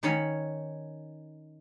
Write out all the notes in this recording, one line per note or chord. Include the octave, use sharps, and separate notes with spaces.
D#3 C#4 C#5 B5